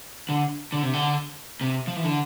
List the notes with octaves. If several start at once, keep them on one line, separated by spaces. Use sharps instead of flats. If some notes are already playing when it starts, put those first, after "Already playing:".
D3
D3
C3
D3
C3
F3
E3
D3